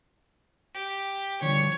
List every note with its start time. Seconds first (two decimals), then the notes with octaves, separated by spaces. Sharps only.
0.74 G4
1.42 D3 F3 G3 C#5